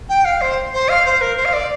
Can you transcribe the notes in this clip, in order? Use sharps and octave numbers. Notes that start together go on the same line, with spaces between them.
G5
F5
C5
C5
F5
C5
A#4
C5
F5
D5